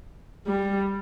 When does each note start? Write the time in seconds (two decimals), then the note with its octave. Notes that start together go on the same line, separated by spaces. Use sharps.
0.47 G3